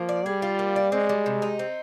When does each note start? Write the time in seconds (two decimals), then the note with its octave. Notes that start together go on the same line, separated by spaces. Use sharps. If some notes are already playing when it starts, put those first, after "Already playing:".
Already playing: F3 A#3
0.09 D5
0.26 G3 G#4
0.42 F4
0.59 A#3
0.76 D5
0.92 G#3 C4
1.09 G3
1.26 C3
1.42 D#4
1.59 C4